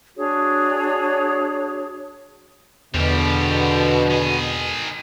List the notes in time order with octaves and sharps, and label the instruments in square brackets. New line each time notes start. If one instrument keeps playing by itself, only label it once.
[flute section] D4 F#4 G#4 C#5
[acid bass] E2 [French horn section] B2 [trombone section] D3 [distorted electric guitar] F3 G4
[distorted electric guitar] D#3 G#4